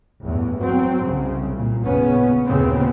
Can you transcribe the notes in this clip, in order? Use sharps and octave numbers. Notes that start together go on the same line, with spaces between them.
A1 E2 G2
F#3 C4
C2 C#3
A#2
G#1 E2 A#2 C#3 B3 C#4
D#2 A#2 C#3 B3 C4